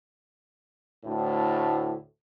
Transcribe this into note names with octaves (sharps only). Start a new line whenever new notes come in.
D2 A2